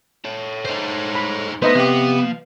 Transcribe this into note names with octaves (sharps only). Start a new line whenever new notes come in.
A4 C#5
D#4 C5
B5
A3 B3 D#4 B4 C5 D#5 E5
C3 F3 G4 F5